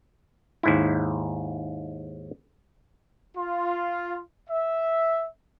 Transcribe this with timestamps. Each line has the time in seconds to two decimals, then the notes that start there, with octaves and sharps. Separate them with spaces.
0.63 D#2 G#2 E4
3.36 F4
4.50 E5